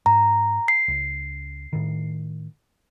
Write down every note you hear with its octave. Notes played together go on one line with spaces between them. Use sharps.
G#2 A#5
C7
C#2
A2 D#3